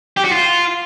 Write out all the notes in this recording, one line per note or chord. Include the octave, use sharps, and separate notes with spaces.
G4
F#4
F4